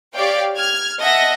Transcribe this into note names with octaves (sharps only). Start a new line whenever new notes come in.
G4 C#5 D5 F5 G5
F6 G#6
D#5 E5 F#5 A5 A#6